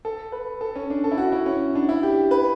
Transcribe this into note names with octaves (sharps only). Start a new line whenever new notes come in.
A4
B4
A4
C#4
D4
A4
E4
F#4
E4
C#4
D4
E4
G4
B4